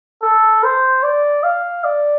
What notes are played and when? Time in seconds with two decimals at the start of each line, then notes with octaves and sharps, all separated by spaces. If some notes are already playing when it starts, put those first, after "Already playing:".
0.23 A4
0.63 C5
1.03 D5
1.43 F5
1.84 D5